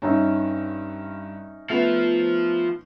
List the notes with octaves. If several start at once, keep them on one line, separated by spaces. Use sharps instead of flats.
G2 C#4 D#4 E5
F3 A3 B3